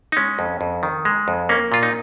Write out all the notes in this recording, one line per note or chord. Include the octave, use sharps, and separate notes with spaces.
D#4
G#3 C#4
F2
F2
D#3
G#3
F2
A#3 C#4
A#2 F4
D#4